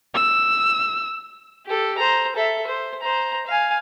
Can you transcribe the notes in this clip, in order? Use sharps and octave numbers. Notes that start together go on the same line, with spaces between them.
E6
G4 A4
C5 A#5
A4 E5
C5
C5 A#5
F5 G#5